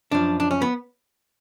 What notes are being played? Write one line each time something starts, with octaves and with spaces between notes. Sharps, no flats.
F#2 F3 D4
D4
C#4
B3